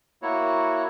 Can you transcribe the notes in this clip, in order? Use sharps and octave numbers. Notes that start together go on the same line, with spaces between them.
A#3 E4 F#4 C#5